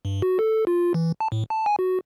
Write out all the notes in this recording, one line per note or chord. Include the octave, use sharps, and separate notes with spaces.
G2
F#4
A4
F4
E3
A5
A2
A5
G#5
F#4